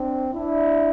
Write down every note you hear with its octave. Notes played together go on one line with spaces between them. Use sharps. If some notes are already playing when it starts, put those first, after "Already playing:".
Already playing: C4 D4
D4 E4